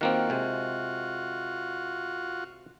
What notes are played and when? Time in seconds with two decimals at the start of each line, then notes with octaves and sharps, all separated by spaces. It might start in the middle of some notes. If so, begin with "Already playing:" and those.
0.01 D#3 A#3 C4 F4 F#4
0.30 C3 G#3